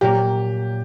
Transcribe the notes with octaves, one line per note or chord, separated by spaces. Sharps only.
A#2 F#3 A#3 G4